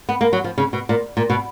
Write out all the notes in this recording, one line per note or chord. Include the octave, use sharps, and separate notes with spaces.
B3
A#3
F#3
F3
C#3
B2
A#2
A#2
B2